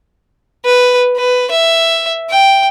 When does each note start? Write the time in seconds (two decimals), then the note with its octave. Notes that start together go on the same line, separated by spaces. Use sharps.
0.65 B4
1.16 B4
1.51 E5
2.30 G5